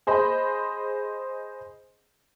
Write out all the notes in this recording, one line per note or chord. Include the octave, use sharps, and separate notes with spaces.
G#4 C5 D#5 B5